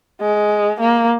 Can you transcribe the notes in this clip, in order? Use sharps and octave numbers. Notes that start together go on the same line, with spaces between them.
G#3
A#3